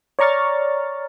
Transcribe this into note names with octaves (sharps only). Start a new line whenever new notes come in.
C#5 D5 A#5 C#6 F6 A6